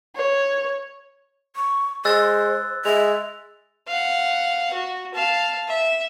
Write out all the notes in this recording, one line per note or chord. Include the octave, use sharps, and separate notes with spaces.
C#5
C#6
G#3 C5 E6 F#6 A6
G#3 E5 F7
F5 F#5
F#4
F5 A5
E5